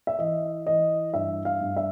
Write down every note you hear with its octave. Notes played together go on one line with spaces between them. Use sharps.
E5
E3 D#5
E3 D#5
G2 E5
F5
G2
E5